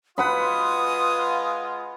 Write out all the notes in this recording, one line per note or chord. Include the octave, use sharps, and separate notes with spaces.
G#3 F4 B4 F#5 B5 D#6